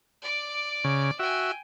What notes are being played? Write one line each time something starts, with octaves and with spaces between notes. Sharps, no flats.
D5 D6
C#3
F#4 E5 G5 G#5